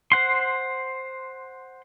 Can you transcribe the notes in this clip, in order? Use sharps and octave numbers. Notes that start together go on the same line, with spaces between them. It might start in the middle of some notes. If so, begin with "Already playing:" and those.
C5 F#5 C6